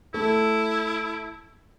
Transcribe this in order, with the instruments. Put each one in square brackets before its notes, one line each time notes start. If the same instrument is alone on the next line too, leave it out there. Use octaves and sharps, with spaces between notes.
[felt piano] A3 [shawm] E4